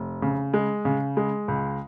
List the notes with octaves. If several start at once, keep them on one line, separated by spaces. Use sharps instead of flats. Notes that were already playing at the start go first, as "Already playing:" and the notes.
Already playing: F1
C#3
G#3
C#3
G#3
C#2